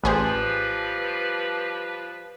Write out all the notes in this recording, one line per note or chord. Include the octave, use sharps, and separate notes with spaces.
A1 F3 G3 G#4 B4 C5